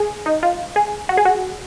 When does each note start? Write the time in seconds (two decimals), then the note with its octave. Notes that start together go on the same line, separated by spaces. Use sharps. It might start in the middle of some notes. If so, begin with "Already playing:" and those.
Already playing: G#4
0.26 D#4
0.43 F4
0.76 G#4
1.09 F#4
1.17 G#4
1.25 F#4